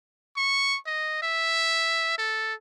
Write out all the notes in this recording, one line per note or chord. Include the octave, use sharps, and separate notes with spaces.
C#6
D#5
E5
A4